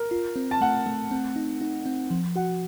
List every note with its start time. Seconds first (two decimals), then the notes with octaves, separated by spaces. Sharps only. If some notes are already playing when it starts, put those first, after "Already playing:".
Already playing: A#4
0.11 F4
0.36 C4
0.51 A5
0.61 A3 F#5
0.86 A3
1.11 C4
1.36 D#4
1.61 D#4
1.86 C4
2.11 F3
2.36 F#4 F#5